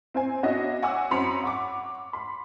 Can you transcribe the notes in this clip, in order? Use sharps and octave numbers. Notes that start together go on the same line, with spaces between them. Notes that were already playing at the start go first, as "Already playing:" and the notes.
C4 C5 G#5
B3 D4 F#4 C#5 D#5 E5
F#5 G#5 C#6 D6 E6
F#2 C4 B5 C6 C#7 F7
F#5 C#6 D6
B5 C6